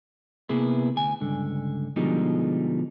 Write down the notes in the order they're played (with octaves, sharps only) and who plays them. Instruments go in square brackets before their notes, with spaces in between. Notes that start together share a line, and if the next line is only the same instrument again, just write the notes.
[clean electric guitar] C3 A#3 B3 E4 G#4 B4
D2 G#5
C#2 G2 D3
B2 D3 F3 G3 G#3 D#4